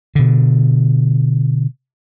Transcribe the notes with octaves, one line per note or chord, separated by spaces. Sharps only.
B2 D3